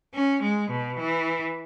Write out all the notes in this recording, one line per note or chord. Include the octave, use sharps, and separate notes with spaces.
C#4
G#3
B2
E3